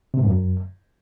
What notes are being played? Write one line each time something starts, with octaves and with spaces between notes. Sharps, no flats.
C3
G#2
F#2